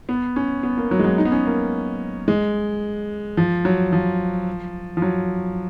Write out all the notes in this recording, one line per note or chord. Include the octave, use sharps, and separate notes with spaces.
B3
C#4
B3
A#3
F#3
G#3
F#3
D#4
B3
C#4
A#3
G#3
F3
F#3
F3
F3
F#3